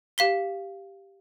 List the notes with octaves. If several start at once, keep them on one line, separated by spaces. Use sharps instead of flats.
G4 F5 B6 G7